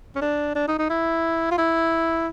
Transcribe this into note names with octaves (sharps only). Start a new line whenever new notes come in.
C#4
D4
D4
D#4
D#4
E4
F4
E4